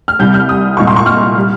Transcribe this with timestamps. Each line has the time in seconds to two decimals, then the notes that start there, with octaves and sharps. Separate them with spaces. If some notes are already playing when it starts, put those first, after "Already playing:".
0.08 F6
0.19 C2 C3 G3 G6
0.34 F6
0.49 D#6
0.77 C2 A#2 G#3 C#6
0.87 C6
0.96 C#6
1.06 F6
1.37 G3